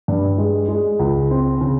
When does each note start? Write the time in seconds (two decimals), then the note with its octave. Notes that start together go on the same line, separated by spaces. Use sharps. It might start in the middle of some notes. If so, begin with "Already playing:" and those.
0.08 G2
0.38 G#3
0.68 G#3
0.99 C#2
1.31 C4
1.61 C#3